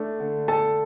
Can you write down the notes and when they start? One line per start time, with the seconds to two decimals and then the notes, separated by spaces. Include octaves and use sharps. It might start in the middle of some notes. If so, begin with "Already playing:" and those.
Already playing: A3 D4
0.20 D3
0.48 A4 A5